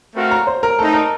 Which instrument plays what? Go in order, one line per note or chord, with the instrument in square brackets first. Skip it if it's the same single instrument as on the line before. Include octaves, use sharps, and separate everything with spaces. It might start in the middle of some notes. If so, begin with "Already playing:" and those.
[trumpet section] A3 C4 F#4 A#4 F5
[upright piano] A#5
C5
A#4
[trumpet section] A3 C4 D#4 [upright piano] A4
[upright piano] A#4